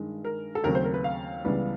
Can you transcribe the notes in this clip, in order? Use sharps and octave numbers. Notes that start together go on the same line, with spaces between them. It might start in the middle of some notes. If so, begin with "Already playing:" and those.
Already playing: G2 D#3 G#3
A#4
A4
D#2 C#3 F#3 A3 C4 A#4
C5
A#4
B4
F5
C#2 C#3 E3 G3 B3